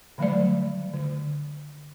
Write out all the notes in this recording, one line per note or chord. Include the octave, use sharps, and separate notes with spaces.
D3 D#3 F#3 G3 A3 D5
D3